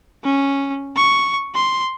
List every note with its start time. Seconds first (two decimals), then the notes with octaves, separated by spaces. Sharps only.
0.24 C#4
0.96 C#6
1.55 C6